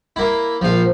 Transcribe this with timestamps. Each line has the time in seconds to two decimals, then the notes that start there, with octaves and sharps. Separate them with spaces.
0.16 A#3 E4
0.62 A#1 F3 C5 F5